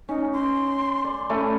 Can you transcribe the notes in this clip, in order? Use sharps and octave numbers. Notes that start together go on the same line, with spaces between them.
C#4 D#4
C6
D5
A3 C#4 E4